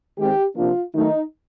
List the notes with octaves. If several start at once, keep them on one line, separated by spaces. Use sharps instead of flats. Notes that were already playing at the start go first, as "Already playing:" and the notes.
D#3 G#3 C4 G4
C3 F3 A#3 D4 F4
D#3 F#3 A3 D#4